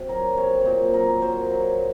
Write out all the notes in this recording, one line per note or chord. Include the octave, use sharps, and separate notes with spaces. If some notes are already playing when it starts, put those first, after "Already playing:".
Already playing: C3 F#4
F#3 A#4
C3 C#5
A#2 C5 C#5
F#3 A#4
F#3 C5
F#3